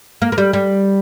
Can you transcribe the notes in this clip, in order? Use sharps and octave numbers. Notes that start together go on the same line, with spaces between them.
A#3
A#3
G3
G3